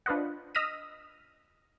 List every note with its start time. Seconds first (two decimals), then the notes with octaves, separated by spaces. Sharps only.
0.06 D4 F4 B4 C5 D#5 F#5
0.55 D#5 E6 F6 A#6 B6 D#7